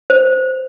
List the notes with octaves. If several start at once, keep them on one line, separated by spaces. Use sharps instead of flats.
C5